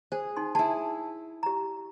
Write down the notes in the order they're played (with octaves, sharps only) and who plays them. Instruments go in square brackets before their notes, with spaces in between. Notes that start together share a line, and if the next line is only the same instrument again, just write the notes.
[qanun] G#4 [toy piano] C5
[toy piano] D#4 C6
[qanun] E4 G#4 [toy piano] A5
[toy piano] G4 A#5